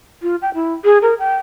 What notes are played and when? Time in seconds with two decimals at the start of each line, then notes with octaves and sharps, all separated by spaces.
0.22 F4
0.42 G5
0.54 E4
0.85 G#4
1.02 A#4
1.19 G5